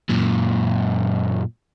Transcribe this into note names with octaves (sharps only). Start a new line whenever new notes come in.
F#2 A#2